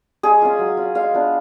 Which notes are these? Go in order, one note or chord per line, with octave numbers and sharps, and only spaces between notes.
G#3 G#4
C#4 F4
F#3
C#4 F4
G#3 F5
B3 D4 F4